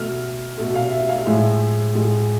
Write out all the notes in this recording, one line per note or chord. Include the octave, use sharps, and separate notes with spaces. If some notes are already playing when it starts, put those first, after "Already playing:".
Already playing: B2 A3 F6
B2 A3
F5
E5
F5
A2 F3 G#3 E5
A2 F3 G#3